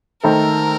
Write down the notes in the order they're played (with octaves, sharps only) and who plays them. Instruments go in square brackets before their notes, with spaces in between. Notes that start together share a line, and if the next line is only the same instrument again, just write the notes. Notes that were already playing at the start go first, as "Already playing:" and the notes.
[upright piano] D#3 A3 D#4 A4 C5 [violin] A#4